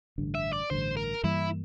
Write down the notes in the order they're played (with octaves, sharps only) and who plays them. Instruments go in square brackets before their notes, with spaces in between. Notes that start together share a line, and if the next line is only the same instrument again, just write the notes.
[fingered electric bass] A1 G2 D3
[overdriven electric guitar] E5
D5
[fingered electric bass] A1 G2 D3 [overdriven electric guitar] C5
[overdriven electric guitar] A#4
[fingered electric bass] G2 E3 G3 A#3 [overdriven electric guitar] E4